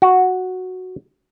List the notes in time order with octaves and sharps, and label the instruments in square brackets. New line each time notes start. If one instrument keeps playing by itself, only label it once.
[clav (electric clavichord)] F#4